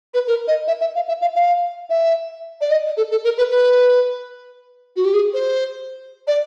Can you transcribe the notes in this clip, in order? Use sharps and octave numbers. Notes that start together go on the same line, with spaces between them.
B4
A#4
D#5
E5
E5
F5
E5
F5
F5
E5
D5
D#5
A4
A4
A#4
B4
B4
F#4
G4
G#4
C5
D5